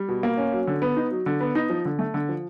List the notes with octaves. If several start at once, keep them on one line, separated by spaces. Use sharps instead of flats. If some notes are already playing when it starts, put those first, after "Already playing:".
Already playing: G3
B2
A#3
C#4
F#3
D3
B3
D#4
F#3
D3
B3
D#4
F3
D3
A3
D3
F3